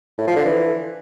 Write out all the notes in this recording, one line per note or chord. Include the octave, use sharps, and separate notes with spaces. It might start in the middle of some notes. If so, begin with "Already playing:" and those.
A2
F3
D3
E3